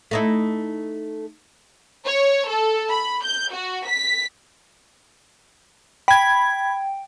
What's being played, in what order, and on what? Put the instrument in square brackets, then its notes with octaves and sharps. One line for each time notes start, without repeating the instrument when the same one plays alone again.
[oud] A3 D#4 E4
[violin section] C#5
A4
B5
G6
F#4
B6
[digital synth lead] G5 [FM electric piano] B5 G#6